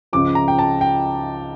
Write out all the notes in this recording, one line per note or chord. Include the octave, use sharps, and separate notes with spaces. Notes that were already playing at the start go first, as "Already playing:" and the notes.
C#2 C#3 F3 D6
A#5
G5
A5
G5